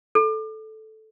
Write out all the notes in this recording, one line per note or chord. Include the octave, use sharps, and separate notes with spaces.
A4